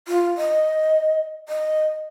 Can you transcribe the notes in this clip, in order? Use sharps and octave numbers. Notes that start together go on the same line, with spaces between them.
F4
D#5
D#5